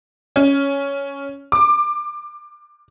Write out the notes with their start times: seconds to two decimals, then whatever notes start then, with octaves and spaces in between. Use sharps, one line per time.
0.36 C#4
1.52 D6